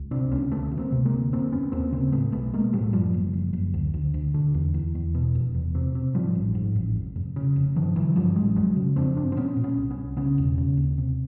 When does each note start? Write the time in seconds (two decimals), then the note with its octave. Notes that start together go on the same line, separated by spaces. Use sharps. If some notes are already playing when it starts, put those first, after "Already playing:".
Already playing: C#2
0.11 C3 C4 D4
0.31 C#2 B3 C#4
0.51 D2 A3 B3
0.71 D2
0.79 A#3 C4
0.92 C3
1.05 G#3 A#3
1.13 D2
1.32 F1 A#3 C4
1.52 F1 B3 C#4
1.72 D#2 A#3 C4
1.92 C#3 A#3 C4
2.12 A2 A3 B3
2.32 B1 A3 B3
2.53 B1 G#3 A#3
2.73 A2 G3 A3
2.93 F#2 F3 G3
3.14 F#1
3.33 F#1
3.53 F#1
3.74 D2
3.94 D2
4.14 D2
4.34 D3
4.54 E2
4.74 E2
4.95 E2
5.15 B2
5.35 F1
5.55 E2
5.75 C3
5.95 C3
6.15 G#2 F3 G3
6.35 A1
6.55 G#2
6.76 A1
6.96 F1
7.16 F1
7.36 C#3
7.56 F1
7.76 G2 D#3 F3
7.96 D3 E3 F#3
8.16 G2 F3 G3
8.36 A1 F#3 G#3
8.56 F2 F#3 G#3
8.76 C#3
8.96 F2 C4 D4
9.16 G1 C4 D4
9.32 C4
9.36 A#2 B3 C#4
9.57 A#2
9.64 B3 C#4
9.77 C2
9.91 B3 C#4
9.97 C2
10.17 C#3 B3 C#4
10.38 E1
10.58 C#3
10.77 D#2
10.98 C3